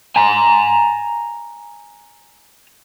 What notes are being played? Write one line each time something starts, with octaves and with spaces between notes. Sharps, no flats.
G#5 A#5